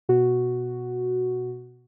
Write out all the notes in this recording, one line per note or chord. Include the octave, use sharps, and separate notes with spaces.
B2 F#4